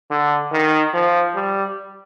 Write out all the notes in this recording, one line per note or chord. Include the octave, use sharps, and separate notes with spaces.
D3
D#3
F3
G3